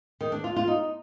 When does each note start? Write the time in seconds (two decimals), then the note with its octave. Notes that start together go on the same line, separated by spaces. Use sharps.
0.21 D#3
0.32 D4
0.44 F4
0.56 F4
0.68 D#4